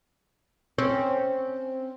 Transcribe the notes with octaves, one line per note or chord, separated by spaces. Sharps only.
C4 C#4